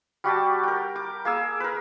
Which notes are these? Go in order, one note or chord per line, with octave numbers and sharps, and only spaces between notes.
G3 F#4 G4 A5
A#4 G5
D6
A#3 G#4 E6
A#4 B4